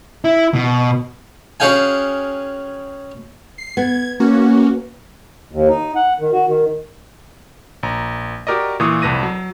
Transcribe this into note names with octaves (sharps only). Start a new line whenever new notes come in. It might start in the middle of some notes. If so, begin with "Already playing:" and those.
E4
B2
C#4 F#4 G#4 F5 G5 G#5
C7
B3 G#6
A#3 C#4 F#4
D#2
D#4
F#5
D#3
F#4
D#3
A#1 A#5
F#4 G4 A#4 D5 D#5
A#2 E3 F4 C#6 D#6
C2 F2 B4 A#6 D#7
F#3